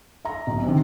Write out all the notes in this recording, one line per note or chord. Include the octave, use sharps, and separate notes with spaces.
E5 A#5
B1
C3 D#3